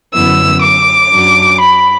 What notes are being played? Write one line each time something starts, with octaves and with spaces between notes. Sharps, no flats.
F#2 D3 B3 E4 E6
D6
F#2 F#3 D4
B5